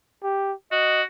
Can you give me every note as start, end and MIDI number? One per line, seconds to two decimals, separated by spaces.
0.23 0.53 67
0.72 1.03 66
0.72 1.02 75